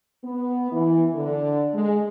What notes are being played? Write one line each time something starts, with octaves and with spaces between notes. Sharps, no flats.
B3
E3
D3
G#3